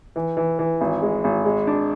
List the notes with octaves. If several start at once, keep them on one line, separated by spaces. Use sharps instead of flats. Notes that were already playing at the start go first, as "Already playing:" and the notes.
E3
E3
E3
G#1
G#3
G#1
G#3
D4